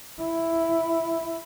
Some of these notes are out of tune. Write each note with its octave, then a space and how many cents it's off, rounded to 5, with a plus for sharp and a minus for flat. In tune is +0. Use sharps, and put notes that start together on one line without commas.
E4 +5